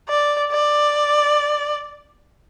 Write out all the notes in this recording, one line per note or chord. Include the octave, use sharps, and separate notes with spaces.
D5
D5